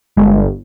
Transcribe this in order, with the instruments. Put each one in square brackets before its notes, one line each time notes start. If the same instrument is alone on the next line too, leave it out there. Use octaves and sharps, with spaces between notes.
[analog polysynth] G1 [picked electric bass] G#3